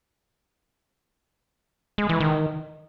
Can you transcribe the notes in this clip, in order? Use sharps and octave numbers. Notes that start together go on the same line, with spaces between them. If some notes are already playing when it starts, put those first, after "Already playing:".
G#3
E3
D#3